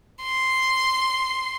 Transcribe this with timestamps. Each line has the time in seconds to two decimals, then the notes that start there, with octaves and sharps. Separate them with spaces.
0.24 C6